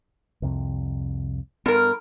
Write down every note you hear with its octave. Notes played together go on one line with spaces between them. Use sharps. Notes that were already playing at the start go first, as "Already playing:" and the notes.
C2 F2 C3
G2 B3 A#4